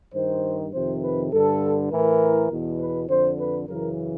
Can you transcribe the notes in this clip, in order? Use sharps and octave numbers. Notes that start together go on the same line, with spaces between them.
G2 D#3 C5
F2 C3 D#3 C5
B4
G2 D3 A4
A2 E3 A#4
E2 B2
B4
F2 D3 C5
B4
F#2 C#3 E3 A#4